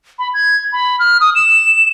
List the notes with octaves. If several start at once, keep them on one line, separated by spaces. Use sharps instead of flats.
B5
G#6
B5
F6
D#6
E7